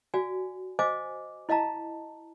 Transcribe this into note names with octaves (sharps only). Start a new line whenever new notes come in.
F#4 D5 F5 G#5
C5 D#5 F5 G#5 D6
E4 D#5 F5 A5 A#5